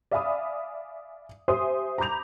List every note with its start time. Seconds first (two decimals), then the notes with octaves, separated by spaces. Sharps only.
0.11 D5 E5 F5 G#5 B5 D#6
1.48 G4 C5 E5 G#5 C6 D#6
1.98 A#5 B5 D6 G6 F7